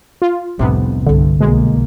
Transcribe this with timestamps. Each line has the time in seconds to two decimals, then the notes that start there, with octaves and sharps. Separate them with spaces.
0.22 F4
0.59 C2 F2 A2 C3 B3 D4
1.06 G1 C2 G2 D3
1.40 B1 B2 G#3 A#3